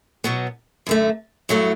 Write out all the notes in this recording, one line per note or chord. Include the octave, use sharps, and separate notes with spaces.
B2 F#3 B3
F#2 D3 A3
G2 F#3 A3 E4